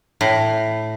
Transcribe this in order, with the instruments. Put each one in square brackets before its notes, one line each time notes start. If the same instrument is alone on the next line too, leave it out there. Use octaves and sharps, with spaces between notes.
[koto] A2